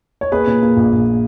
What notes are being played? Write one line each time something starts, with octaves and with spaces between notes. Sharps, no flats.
C#5
A#3 G#4 B4
A#2
A#3
A#1
A#1